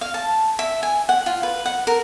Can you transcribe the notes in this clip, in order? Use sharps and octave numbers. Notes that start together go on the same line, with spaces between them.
F5
A5
E5
G#5
F#5
F4
B4
F#5
A#4